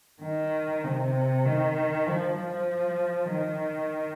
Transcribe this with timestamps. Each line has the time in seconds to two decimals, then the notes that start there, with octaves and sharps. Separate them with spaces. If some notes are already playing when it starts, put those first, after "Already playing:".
0.22 D#3
0.84 C3
1.46 D#3
2.07 F3
2.37 F3
3.30 D#3